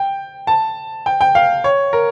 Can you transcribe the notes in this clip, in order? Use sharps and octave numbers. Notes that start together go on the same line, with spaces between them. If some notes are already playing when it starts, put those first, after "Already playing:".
Already playing: G5
A5
G5
G5
F5
C#5
A#4